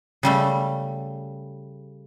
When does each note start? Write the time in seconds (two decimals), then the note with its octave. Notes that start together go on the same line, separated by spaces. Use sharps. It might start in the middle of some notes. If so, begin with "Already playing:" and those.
0.23 C#3 G3 A3